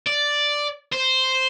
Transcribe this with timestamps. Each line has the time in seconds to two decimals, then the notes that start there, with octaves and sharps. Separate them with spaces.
0.07 D5
0.93 C5